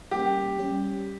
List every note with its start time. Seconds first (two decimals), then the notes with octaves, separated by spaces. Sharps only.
0.11 G3 A#3 C#4 G4
0.59 G3 C#4 G4